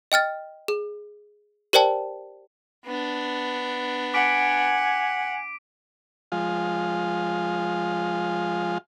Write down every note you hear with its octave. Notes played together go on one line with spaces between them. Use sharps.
D#5 G5 F6 A6
G#4
G4 A#4 C5 D5 G5 A5
B3 D4
F#5 G#5 D6 B6 D7
F3 G#3 F4